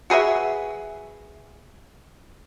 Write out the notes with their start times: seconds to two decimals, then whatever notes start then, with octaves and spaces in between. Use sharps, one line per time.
0.10 F#4 G#4 B4 E5